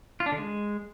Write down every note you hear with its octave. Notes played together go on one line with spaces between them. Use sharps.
F4
D4
D3
G#3